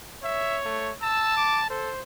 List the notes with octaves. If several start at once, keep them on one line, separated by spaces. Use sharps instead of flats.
C#5 E5
A3
A5 E6
D6
A4 C5